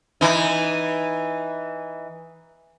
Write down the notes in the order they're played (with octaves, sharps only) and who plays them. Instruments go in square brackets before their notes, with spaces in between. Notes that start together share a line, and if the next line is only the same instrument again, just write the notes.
[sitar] E3 D#4